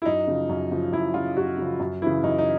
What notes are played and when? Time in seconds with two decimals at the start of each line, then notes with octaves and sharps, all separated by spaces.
0.02 E4
0.05 F#2 D#4
0.27 C#3 F3
0.49 F#2
0.71 C#3 F3
0.92 F#2 E4
1.14 C#3 F3 F4
1.37 F#2 F#4
1.58 C#3 F3
1.79 F#2
2.02 C#3 E3 E4
2.23 F#2 D#4
2.38 D#4